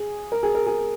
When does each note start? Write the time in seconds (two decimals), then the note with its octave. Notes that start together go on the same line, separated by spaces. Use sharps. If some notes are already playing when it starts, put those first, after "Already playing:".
Already playing: G#4
0.32 A#4
0.43 G#4
0.55 A#4
0.66 G#4